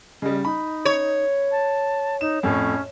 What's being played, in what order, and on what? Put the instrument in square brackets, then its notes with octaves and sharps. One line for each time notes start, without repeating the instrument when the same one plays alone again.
[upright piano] C#3 G3 [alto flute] D#5
[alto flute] D#4 [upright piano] B5
[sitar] C#5
[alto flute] A5
[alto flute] D#4 [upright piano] E7
[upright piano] F2 A2 [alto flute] C#4